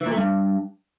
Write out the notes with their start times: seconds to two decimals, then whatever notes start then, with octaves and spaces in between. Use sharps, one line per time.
0.01 E3
0.06 A#2
0.11 A3
0.16 G2